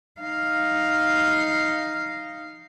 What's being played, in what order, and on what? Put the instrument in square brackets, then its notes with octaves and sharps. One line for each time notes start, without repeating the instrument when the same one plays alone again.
[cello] D#4 F5